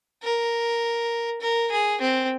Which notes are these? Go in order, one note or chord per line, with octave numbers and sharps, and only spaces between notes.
A#4
A#4
G#4
C4